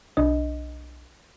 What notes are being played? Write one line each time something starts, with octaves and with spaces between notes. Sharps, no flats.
B1 D4 D#5